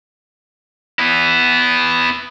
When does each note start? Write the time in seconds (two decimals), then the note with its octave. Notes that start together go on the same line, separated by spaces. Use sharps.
0.99 B3 E4